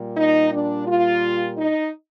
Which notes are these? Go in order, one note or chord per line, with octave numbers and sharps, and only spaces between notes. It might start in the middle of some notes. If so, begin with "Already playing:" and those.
Already playing: A#2 G3
D#4
D4
F4
D#4